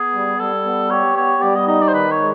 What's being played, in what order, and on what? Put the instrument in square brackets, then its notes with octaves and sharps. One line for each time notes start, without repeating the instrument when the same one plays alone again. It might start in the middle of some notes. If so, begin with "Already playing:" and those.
Already playing: [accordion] B3 [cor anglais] G#4
[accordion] G3
[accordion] G3 [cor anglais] A4
[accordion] B3
[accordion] G4 [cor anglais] C#5
[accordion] B3 [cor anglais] C#5
[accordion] G3 [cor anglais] D5
[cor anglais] D#5
[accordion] D#4 [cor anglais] D#5
[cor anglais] D5
C5
[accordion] D#3 [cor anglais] B4
[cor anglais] C#5
[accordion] G#3